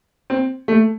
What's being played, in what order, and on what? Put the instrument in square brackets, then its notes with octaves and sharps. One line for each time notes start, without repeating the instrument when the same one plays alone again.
[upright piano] C4
A3